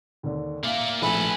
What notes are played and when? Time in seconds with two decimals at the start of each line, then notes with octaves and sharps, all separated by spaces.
0.23 D#2 D3
0.64 A#3 D5 E5 F5
1.02 A#1 A3 A4 B4 G#5 B5